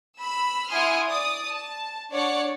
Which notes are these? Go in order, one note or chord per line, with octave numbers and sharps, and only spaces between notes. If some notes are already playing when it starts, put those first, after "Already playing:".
B5 E6
E4 F#5 G#5 C6 D#6 F6
D5 D#6
A5
D4 C#5 D5 F#5 C#7